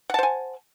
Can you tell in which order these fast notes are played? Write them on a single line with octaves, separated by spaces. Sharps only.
F#5 A5 C5 G#5